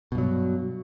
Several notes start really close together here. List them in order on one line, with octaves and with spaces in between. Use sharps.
B2 G2 F#3